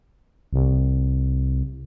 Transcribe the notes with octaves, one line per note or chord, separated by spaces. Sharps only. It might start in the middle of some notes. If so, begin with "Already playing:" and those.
C2